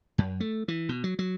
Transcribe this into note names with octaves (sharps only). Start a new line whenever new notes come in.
F#2
A3
E3
B2
F#3
F#3